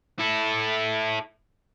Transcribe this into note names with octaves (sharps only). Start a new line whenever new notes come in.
E4 A4